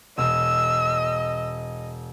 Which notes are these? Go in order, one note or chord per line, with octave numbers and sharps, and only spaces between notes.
E1 D#5 E6